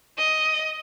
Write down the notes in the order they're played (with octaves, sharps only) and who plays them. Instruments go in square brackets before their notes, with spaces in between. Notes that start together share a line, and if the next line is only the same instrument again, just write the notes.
[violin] D#5